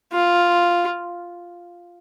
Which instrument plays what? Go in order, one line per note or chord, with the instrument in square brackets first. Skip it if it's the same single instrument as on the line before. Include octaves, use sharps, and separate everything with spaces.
[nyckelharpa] F4